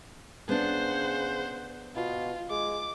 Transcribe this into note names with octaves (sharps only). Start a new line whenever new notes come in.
C#3 B3 D4 C5 F#5
B2 F4
G#3 D6